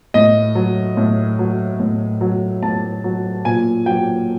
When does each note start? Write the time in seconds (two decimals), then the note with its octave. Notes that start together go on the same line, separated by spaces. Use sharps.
0.14 A2 D#5
0.55 F#3
0.97 A2
1.39 F#3
1.80 A2
2.21 F#3
2.62 A2 A5
3.04 F#3
3.45 A#2 G#5
3.86 F#3 G5